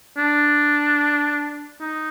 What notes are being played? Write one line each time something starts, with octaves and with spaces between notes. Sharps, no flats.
D4
D#4